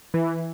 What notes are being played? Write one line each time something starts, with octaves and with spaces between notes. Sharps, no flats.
E3